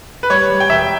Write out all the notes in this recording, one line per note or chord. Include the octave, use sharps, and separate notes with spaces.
B4
G3 C#5
G3
G5
E1 E5